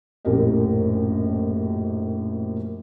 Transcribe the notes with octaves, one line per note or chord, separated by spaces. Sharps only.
A#1 F#2 A2 G4 A#4 D#5